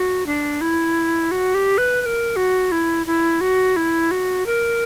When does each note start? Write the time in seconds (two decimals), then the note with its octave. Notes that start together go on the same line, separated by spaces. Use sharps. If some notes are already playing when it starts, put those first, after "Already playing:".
Already playing: F#4
0.26 D4
0.61 E4
1.31 F#4
1.54 G4
1.78 B4
2.01 B4
2.06 A#4
2.36 F#4
2.72 E4
3.06 E4
3.41 F#4
3.76 E4
4.11 F#4
4.46 A#4